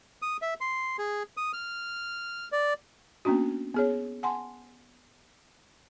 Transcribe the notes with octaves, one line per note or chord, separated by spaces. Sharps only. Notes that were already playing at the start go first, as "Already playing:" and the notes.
D#6
E5
C6
G#4
D#6
F6
D5
A#3 B3 C#4 D4 F#4
B3 G#4 C#5
F#5 G#5 A5 C6